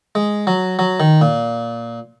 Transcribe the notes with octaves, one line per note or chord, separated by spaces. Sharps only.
G#3
F#3
F#3
D#3
A#2